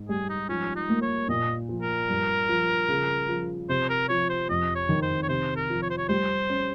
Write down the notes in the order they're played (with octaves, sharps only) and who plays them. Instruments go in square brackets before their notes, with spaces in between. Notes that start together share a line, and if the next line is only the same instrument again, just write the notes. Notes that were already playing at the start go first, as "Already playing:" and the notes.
Already playing: [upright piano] G#2
[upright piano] G3 [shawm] G#4
[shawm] D#4
[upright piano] F3 [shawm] C#4
[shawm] D#4
[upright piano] A#3
[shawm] C#5
[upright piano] A#2 [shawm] D#5
[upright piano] F3
[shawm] A#4
[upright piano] G2
F3
C#3
F3
[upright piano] C3 [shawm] C5
[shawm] A#4
[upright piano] F3 [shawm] C#5
[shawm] C5
[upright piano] F2 [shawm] D#5
[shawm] C#5
[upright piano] D#3
[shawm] C5
C#5
[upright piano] C3 [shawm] C5
[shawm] A#4
[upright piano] F3
[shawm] C#5
C5
C#5
[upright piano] G3 [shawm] C5
[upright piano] C#4